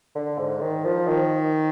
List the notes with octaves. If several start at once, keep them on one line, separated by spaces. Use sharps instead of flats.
D3
G#2
D#3
F3
D#3